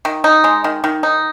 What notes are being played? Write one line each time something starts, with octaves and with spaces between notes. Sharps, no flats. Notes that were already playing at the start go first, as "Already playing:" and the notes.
D#3
D#4
G#3
D#3
D#3
D#4